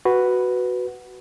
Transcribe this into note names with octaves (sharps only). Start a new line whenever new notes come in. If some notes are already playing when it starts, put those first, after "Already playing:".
F#4 B4